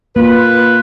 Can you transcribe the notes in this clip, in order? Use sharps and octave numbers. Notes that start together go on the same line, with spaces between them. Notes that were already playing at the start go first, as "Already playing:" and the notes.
A#3 F4 B4